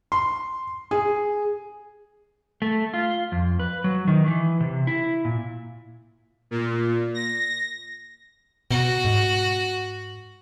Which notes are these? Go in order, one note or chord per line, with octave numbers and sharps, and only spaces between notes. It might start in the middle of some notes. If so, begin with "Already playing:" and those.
C6
G#4
A3
F4
F2
B4
F#3
D#3
E3
C3
E4
A#2
A#2
A#6
B2 F#4
G#2